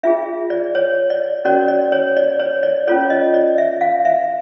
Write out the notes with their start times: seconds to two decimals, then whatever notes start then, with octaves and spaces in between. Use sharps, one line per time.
0.03 D4 F4 G#4 E5
0.50 D5
0.75 C#5
1.10 D5
1.45 C#4 F#4 A#4 C#5 D5
1.68 D5
1.92 C#5
2.17 D5
2.39 C#5
2.63 D5
2.87 C#4 F4 A4 C#5 D5
3.10 D#5
3.34 D5
3.58 E5
3.81 F5
4.05 E5